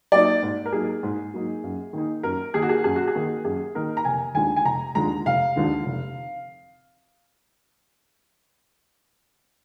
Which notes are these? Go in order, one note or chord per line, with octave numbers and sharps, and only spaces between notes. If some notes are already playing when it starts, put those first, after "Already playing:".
F#3 A#3 D#4 D5
G#2
A#4
F#3 A#3 D#4 G#4
G#2
F#3 A#3 D#4
F#2
D#3 A#3 D#4
F#2 A#4
D#3 A#3 D#4 G#4
F#4
G#4
F#2 G#4
F#4
G#4
D#3 A#3 D#4
F#2 G#4
D#3 A#3 D#4 A#4
A#5
F1 G#5
D#2 D3 F3 G#3 G#5
G#5
F1 A#5
D#2 D3 F3 G#3 A#5
F1 F5
D#2 D3 F3 G#3
F1